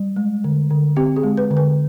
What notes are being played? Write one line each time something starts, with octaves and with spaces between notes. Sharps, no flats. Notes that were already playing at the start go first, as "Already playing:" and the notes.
Already playing: G3
G#3
D3
D3
C4 G4
G#4
G#3
B4
D3
B4